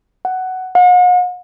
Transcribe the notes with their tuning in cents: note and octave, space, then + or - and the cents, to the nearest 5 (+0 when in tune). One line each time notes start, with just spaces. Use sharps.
F#5 +10
F#5 -45